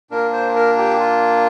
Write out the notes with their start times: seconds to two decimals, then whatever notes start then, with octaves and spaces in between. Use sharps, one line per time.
0.11 A#2 A#3 D4 A#4
0.33 C5
0.56 A#4
0.78 G4
0.99 F4